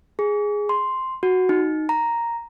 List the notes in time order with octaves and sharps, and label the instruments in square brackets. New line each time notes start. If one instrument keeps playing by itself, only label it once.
[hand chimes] G#4
C6
F#4
D#4
A#5